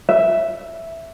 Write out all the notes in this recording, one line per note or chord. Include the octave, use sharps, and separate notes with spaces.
E5